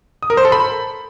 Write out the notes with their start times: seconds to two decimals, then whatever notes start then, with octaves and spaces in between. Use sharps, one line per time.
0.23 D#6
0.30 A#4
0.37 C5
0.45 A4
0.52 B5